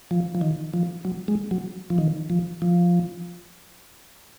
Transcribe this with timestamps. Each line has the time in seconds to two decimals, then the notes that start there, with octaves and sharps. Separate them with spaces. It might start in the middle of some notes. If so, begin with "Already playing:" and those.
0.11 F3
0.35 F3
0.41 D#3
0.74 F3
1.05 F#3
1.28 G#3
1.51 F#3
1.90 F3
1.98 D#3
2.30 F3
2.62 F3